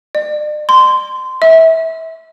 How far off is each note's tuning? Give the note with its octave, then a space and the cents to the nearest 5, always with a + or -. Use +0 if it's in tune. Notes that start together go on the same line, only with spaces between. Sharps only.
D5 +40
C6 -15
E5 -25